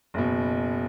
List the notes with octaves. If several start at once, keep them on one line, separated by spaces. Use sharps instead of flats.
F#1 B2